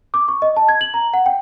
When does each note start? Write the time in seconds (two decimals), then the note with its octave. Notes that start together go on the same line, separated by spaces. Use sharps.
0.14 D6
0.28 C#6
0.42 D#5
0.56 A5
0.69 G#6
0.81 F#7
0.94 A#5
1.14 F#5
1.26 G5